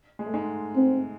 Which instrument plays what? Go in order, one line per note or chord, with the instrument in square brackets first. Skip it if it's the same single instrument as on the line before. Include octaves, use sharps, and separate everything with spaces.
[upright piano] G#3
A3
G#2 G#3
[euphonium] C4